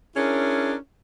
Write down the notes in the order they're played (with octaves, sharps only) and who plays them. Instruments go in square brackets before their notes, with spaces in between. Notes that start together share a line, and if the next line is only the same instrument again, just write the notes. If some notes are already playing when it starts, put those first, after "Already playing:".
[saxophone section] C#4 D4 E4 G#4 A#4 C#5